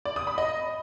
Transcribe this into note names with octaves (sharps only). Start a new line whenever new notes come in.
D5
D#6
B5
D#5